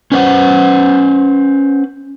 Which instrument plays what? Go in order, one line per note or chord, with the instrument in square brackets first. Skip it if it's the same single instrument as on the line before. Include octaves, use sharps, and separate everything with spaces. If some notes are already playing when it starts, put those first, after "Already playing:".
[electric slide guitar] C#4 B4 C5 E5 F#5